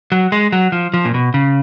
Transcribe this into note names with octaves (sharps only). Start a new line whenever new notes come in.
F#3
G#3
F#3
F3
F3
A#2
B2
C#3